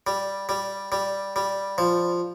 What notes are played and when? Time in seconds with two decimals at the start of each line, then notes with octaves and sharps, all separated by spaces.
0.07 G3
0.49 G3
0.92 G3
1.36 G3
1.78 F3